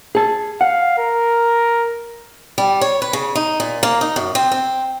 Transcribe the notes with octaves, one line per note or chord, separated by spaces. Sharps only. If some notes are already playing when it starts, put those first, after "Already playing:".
G#4 A5
F5 F#5
A#4
G3
C#5
B4
C#3
D#4
A#2
A#3
D#4
F#2
C4
C4